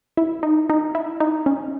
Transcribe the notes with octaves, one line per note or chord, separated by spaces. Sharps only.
E4
D#4
D#4
E4
D#4
C#4